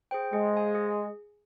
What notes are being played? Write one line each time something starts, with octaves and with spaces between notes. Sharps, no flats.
G#4 C5 G5
G#3 G#4
C5 F5 G#5
G#4